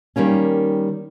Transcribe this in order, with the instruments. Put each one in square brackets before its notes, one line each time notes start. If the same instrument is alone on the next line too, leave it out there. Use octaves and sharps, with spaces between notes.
[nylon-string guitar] D#3 G3 A#3 C#4